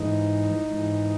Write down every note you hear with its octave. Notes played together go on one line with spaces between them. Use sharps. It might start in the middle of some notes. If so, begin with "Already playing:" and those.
Already playing: G#2 E3 D#4
G#2 E3